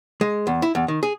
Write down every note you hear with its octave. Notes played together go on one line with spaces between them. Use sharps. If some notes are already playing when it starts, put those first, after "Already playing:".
G#3
E2
E4
E2
D#3
G#4